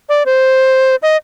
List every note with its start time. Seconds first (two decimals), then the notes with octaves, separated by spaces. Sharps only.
0.09 D5
0.26 C5
1.03 D#5